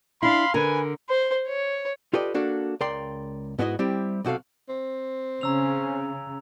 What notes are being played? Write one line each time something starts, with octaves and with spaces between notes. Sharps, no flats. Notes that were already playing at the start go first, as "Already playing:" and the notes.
D4 E4 F5 B5 C6
D3 A#4 B4 G#5
C5
C#5
F4 G4 A4 B4 D5 D#5
A#3 D4 F#4 A4
C#2 A#4 D5 G5 C6
G#2 B3 E4 F#4 D#5
G3 C4 E4 G4
B1 C3 F#4 A4 F5
C4
C#3 C#4 A#5 E6 F7